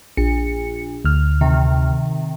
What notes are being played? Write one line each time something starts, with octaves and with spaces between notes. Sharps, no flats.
A#1 C#7
D2 F6
C3 D#3